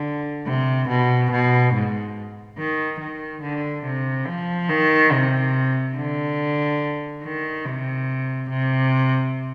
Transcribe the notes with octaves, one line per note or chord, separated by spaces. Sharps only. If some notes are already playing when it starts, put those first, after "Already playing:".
Already playing: D3
C3
B2
B2
G#2
D#3
D#3
D3
C3
F3
D#3
C3
D3
D#3
C3
C3